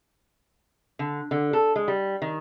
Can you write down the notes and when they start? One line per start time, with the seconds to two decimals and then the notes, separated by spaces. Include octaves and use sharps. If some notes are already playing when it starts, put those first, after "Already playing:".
0.99 D3
1.31 D3
1.53 A4
1.76 G#3
1.88 G3
2.22 D#3